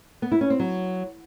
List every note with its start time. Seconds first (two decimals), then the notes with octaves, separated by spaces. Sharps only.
0.22 B3
0.32 E4
0.41 C#4
0.50 C4
0.59 F#3